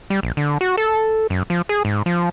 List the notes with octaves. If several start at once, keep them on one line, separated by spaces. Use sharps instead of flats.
G3
A#1
D3
F#4
A4
F#2
F3
G#4
G#2
F3